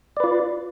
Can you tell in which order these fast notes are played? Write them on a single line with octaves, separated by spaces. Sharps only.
D5 B4 F4